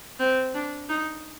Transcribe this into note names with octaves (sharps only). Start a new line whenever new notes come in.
C4
D4
D#4